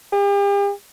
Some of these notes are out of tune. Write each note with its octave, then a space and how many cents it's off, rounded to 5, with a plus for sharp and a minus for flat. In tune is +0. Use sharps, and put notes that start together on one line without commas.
G4 +40